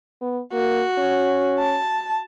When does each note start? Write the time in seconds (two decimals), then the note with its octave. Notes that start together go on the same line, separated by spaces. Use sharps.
0.21 B3
0.53 A#3 F#4
0.98 C#4
1.59 A5